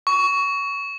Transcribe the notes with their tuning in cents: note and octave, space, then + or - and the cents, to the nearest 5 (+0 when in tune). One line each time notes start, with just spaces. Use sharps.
C#6 +20